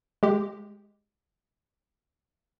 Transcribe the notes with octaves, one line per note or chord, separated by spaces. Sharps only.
G#3 G4